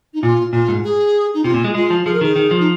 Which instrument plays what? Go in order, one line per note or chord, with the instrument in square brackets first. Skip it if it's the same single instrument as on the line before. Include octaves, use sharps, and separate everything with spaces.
[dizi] D#4
[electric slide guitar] A#2 [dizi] F4
[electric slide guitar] A#2 [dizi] F4
[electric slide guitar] G#2
[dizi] G#4
D#4
[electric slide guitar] C3 [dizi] F4
[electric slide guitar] A#2
G#3
[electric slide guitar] G#3 [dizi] F4
[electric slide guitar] F3
[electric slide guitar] F3 [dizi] G#4
[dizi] A#4
[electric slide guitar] D#3 [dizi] G#4
[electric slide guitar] D#3
F3
[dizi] D#4